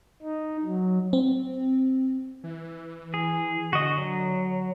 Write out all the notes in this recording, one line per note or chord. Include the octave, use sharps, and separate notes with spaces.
D#4
F#3
C4
E3
G#4
D3 F#4 D#5
F#3